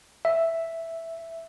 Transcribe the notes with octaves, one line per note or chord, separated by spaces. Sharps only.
E5